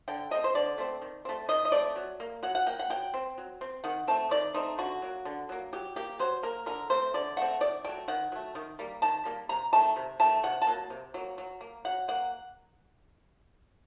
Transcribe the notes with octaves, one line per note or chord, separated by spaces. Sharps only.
D3 G5
A3 C4 D#5
C5
D3 D5
A3 C4
D#3
A3 C4
D#3 D#5
D#5
A3 C4 D5
F#3
A#3
F#3 F#5
F#5
A#3 G5
F#5
F#3 G5
C4
F#3
C4
D#3 F#5
A3 C4 A5
D#3 D5
A3 C4 D#4
D3 F#4
F#3 A#3
D3
F#3 A#3
F#3 G4
A#3 G4
F#3 C5
A#3 A#4
D3 A#4
A3 C4 C5
D3 D5
A3 C4 F#5
D#3 D5
F#3 A3 G5
D#3 F#5
F#3 A3
D#3
G3 A#3
D#3 A5
G3 A#3
C3 A#5
D#3 A3 A5
C3
D#3 A3 A5
C3 F#5
A5
F#3 A#3
C3
F#3 A#3
F#3
A#3
F#3 F#5
A#3 F#5